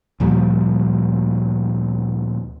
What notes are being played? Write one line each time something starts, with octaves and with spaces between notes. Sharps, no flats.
D2 A#2 F3 G3